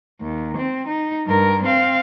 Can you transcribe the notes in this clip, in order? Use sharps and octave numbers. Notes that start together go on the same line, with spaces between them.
D#2
C4
D#4
G2 A#4
C4 F5